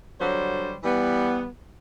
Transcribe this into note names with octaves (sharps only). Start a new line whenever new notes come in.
D3 F#3 G3 C5 C#5
E3 G3 B3